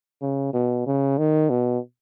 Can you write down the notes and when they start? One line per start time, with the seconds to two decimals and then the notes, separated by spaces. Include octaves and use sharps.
0.22 C#3
0.54 B2
0.86 C#3
1.18 D#3
1.50 B2